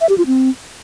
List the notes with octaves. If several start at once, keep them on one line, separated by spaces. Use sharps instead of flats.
E5
G4
F4
C4